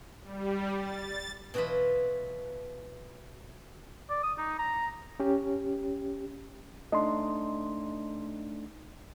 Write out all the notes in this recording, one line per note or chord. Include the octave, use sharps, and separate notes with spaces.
G3
A6
B2 E3 F#3 F4 B4
D5
D#6
D#4
A#5
C#4 G4
A3 D4 D#4 D#5 C6